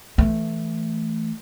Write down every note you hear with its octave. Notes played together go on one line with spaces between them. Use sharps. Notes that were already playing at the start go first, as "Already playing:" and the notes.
E3 A3